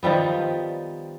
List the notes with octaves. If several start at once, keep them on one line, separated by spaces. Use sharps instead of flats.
D#3 F3 G3 B3